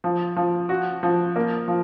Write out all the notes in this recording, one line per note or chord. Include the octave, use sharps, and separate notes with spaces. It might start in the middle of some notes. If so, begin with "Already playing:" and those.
F3
F3
F#4
F3
A#3
F3